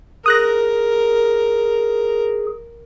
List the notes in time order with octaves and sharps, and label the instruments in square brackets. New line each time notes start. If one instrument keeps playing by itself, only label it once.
[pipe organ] G#4 [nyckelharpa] A#4 [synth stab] D#6 F#6 A#6